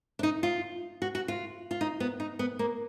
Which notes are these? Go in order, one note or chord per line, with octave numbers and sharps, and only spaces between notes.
D4
D#4
F4
F#4
F#4
F4
F4
D#4
B3
D#4
B3
A#3